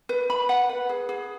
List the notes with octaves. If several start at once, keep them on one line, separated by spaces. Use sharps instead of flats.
B4
B5
F#5
B4
G#4
G#4